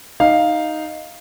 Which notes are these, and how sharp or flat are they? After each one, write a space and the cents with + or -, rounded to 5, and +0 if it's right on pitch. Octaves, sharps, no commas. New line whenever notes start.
D#4 +0 F5 +0